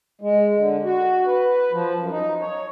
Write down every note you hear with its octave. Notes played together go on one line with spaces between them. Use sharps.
G#3
D3
F#4
B4
F3
F#2
D#4
C#5